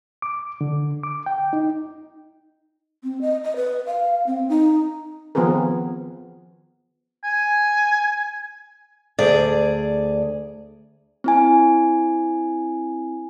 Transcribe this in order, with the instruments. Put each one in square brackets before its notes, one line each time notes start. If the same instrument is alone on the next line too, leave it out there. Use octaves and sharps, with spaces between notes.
[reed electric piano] D6
D3
D6
G5
D#4
[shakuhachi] C4
D#5
D#5
B4
F5
C4
D#4
[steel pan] D#3 F3 B3 C4 G#4 A#4
[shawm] G#5
[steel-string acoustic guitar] D2 G#4 D5
[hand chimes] C4 E4 G#5